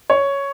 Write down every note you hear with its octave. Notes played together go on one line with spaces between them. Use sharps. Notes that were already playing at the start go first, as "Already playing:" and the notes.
C#5